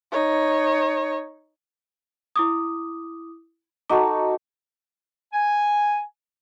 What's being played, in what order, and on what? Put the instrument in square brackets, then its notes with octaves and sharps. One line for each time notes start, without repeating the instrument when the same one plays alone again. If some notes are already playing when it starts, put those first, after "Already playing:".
[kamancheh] D#4 C#5
[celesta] E4 D6 D#6
[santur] D#4 F#4 A4 [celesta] A#5 D6
[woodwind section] G#5